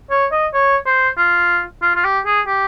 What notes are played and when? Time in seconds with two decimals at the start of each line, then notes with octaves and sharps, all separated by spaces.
0.11 C#5
0.32 D#5
0.54 C#5
0.86 C5
1.18 F4
1.82 F4
1.95 F4
2.04 G4
2.26 G#4
2.47 G4